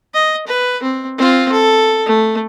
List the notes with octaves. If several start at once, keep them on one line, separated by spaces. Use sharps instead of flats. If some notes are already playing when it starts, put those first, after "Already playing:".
D#5
B4
C4
C4 F4
A4
A3